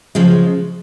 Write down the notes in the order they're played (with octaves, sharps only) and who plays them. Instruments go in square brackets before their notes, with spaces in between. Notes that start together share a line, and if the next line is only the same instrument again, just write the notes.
[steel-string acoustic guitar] C#3 F3 G#3